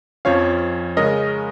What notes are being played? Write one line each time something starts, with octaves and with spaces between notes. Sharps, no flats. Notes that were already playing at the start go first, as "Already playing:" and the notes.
F2 F3 C#4 C#5 F5
C#3 G#3 C#4 A#4 D#5